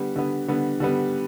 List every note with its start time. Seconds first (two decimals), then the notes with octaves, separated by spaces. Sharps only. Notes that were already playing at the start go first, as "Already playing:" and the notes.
Already playing: D3 G3 B3
0.16 D3 G3 B3
0.48 D3 G3 B3
0.80 D3 G3 B3